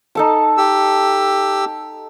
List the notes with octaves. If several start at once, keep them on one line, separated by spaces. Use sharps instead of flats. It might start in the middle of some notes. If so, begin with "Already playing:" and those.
D#4 A4 A5
G4 E6